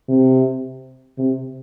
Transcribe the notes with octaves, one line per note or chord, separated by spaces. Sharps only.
C3
C3